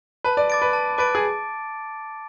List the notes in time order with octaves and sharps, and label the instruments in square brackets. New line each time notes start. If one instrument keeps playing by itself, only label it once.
[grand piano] B4 [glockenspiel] A5
[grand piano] D5
[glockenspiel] D6 A6 D7
[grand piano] B4
[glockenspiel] A5
[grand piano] B4 [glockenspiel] D6 A6 D7
[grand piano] G#4